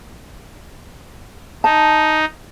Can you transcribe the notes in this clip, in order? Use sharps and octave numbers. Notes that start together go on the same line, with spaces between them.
D#4 A5